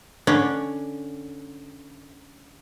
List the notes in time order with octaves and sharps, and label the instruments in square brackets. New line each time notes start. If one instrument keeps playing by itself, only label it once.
[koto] D3 C#4 D4